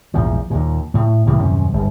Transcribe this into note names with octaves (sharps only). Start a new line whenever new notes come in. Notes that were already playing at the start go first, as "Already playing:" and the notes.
A#1 E2 G#2 F3
D#2 A#2
A2
C2 A2 E3 A#3
D#1 F#2 C3 C#4
G1